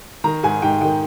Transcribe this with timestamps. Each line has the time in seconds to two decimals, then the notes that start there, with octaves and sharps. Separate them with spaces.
0.24 D#3 A#5
0.43 G#2 G#5
0.62 G#2 G5
0.81 D#3 G5